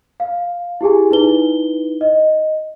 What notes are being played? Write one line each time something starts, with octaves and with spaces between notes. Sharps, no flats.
F5
E4 G4 G#4 G#5
D#4 E4 B4 G7
D#5